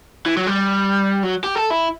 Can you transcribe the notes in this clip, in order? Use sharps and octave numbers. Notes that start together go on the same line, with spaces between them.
E3
F#3
G3
F#3
G4
A4
E4